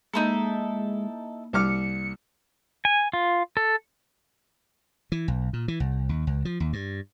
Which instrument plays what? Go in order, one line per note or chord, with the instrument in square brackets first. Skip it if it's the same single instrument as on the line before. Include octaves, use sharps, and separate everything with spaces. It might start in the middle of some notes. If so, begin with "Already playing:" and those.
[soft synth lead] G#3 [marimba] A#3 [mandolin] D#4 E4 A4
[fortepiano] C2 D6 F6 [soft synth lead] C#7
[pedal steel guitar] G#5
F4
A4
[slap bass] E3
B1
A#2
E3
C2
D#2
C#2
F3
D#2
G2